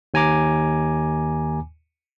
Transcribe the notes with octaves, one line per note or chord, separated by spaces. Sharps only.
D#2 G#5 A#5 D6